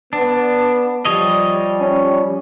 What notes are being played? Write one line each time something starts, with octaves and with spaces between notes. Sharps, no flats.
B3 D4
F3 G3 C#5 D#5
C#4